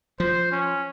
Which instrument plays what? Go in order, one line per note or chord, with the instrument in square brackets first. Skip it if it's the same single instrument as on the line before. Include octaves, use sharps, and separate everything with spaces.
[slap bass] F3 [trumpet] C5
[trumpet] C#4